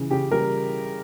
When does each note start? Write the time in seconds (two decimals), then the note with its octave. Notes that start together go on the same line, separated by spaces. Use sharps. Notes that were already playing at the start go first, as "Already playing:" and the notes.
Already playing: C#3 E3
0.11 C#3 G4
0.31 G3 A#4